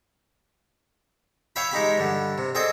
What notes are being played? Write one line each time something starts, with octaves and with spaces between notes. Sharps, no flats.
C#5 E5 F5 G5 B5
G#3 D#4 G4 B5
G2 D3
C3
C4 G#4 A4 D5 D#5 G5